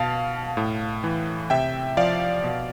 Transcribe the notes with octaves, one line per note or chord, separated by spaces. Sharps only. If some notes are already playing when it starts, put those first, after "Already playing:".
Already playing: B2 F5 A5
A2
E3
C3 E5 G5
F3 D5 F5
B2